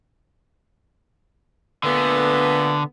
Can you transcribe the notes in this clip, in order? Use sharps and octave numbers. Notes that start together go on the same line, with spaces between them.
A#2 D3 A3 B3